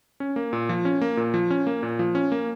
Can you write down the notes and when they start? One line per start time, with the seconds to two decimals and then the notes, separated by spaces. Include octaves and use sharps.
0.20 C#4
0.36 A#3
0.53 A#2
0.69 F3
0.85 C#4
1.01 A#3
1.17 A#2
1.34 F3
1.50 C#4
1.67 A#3
1.83 A#2
1.99 F3
2.15 C#4
2.32 A#3